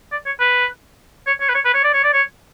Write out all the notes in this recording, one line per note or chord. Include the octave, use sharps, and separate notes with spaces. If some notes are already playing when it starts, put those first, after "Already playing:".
D5
C#5
B4
C#5
C#5
B4
C#5
B4
C#5
D5
C#5
D5
C#5